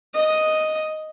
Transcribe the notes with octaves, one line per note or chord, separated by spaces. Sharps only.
D#5